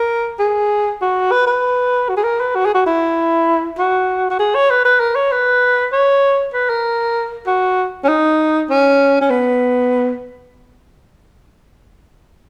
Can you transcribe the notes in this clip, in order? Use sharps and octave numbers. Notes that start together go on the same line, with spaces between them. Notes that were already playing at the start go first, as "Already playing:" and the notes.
Already playing: A#4
G#4
F#4
B4
B4
F#4
G#4
A#4
B4
F#4
G#4
F#4
E4
F#4
F#4
G#4
C#5
B4
B4
A#4
C#5
B4
C#5
B4
A#4
F#4
C#4
D#4
C#4
C#4
B3